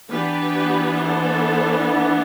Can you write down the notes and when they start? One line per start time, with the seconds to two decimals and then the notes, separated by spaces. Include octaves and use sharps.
0.10 E3 B3 D4 G4 B4
1.03 A4 C5